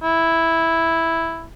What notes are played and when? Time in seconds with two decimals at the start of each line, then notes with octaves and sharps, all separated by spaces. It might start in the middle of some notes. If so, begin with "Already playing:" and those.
0.03 E4